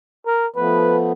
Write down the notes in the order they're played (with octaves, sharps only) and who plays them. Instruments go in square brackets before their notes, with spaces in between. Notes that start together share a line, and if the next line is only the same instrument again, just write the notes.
[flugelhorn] A#4
[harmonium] F3 A3 B3 [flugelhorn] B4